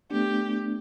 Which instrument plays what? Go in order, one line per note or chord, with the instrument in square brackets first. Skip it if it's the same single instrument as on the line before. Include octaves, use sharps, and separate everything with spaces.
[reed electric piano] A3 B3 D4 [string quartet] G4